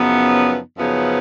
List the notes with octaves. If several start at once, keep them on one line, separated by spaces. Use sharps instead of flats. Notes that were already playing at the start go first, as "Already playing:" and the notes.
Already playing: F#2 C#3 F3 B3 D#4
F#2 C#3 F3 B3 D#4